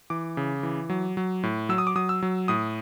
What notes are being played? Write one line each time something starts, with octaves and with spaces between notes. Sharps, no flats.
E3 D6
C#3
E3
F#3
F#3
A2
F#3 E6
D#6
D6
F#3 D#6
E6
F#3
A2 D#6